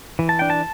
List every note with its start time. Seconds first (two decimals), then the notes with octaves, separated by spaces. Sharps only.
0.19 E3
0.29 A5
0.39 D4 G5
0.50 A5